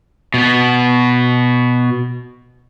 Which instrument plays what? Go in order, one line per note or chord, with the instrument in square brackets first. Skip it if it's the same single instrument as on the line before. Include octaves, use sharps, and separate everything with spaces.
[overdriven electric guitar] B2 B3